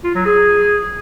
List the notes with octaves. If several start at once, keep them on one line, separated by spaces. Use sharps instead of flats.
F4
F#3
G#4